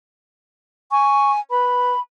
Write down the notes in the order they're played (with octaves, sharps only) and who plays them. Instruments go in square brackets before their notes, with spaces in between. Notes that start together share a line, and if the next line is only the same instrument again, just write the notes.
[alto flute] G#5 [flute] C#6
[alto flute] B4 [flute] B5